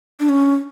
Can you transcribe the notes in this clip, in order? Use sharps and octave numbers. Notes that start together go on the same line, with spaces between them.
D4
C#4